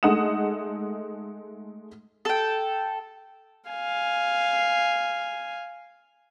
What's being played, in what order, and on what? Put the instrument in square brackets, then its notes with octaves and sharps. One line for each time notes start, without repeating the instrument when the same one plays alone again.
[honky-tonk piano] G#3 A3 D#4 F#5 D#6 E7
[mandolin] A4 G5
[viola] F5 G#5